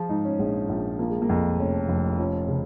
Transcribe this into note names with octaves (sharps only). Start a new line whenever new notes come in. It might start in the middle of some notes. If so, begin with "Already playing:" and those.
Already playing: F3 F4 G#4
G#2 D#4
C#4
A#1 G#3
A#1
F3 A#3
G#3
A#3
F2
F1 C#4
F1
F3 C#4
C#3